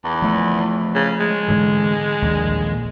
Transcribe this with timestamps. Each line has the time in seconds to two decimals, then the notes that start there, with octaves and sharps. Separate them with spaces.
0.04 E2
0.22 F3 A3
0.95 C#3
1.20 G#3
1.48 G#2 D3 E3
2.22 A#1 D#2